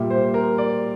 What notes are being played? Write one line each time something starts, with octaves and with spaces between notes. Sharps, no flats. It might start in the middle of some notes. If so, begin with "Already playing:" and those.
Already playing: A#2 G3 E5
C5
A#4
D5